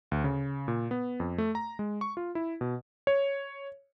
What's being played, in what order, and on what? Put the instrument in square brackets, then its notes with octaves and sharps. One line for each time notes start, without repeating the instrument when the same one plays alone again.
[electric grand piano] D2
C#3
A#2
B3
F2
A3
A#5
G#3
C#6
F4
E4
B2
C#5